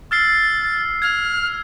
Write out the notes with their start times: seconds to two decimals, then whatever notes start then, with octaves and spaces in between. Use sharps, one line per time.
0.11 E6 F6 A6 C7
1.02 F6 G#6